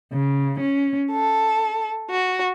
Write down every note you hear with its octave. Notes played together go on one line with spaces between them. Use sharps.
C#3
C#4
A4
F#4